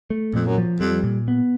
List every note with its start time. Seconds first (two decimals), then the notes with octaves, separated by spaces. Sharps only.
0.10 A3
0.33 F2 A#2
0.46 F#2
0.58 F3
0.80 F2 G3
1.04 A#2
1.28 B3